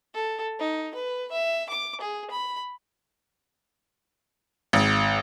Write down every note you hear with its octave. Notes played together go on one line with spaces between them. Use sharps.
A4
D#4
B4
E5
D6
G#4
B5
G#1